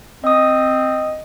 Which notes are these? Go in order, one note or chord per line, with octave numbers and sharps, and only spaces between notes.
C4 D#5 D#6